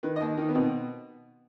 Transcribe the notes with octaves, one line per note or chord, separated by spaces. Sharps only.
D#3 B4
D#5
D#2
D#3 D#4
B3
B2 C4